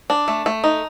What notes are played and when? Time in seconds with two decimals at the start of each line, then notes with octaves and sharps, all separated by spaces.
0.10 D4
0.28 A3
0.46 A3
0.64 D#4